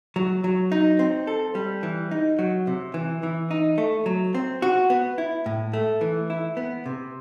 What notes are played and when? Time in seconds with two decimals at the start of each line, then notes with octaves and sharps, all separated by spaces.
0.16 F#3
0.44 F#3
0.72 D#4
0.99 C4
1.27 A4
1.55 G3
1.83 E3
2.11 D#4
2.39 F#3
2.67 C3
2.94 E3
3.23 E3
3.51 D#4
3.78 A3
4.06 F#3
4.35 C4
4.62 F#4
4.90 B3
5.18 E4
5.46 A2
5.73 A3
6.01 E3
6.30 E4
6.57 B3
6.86 C3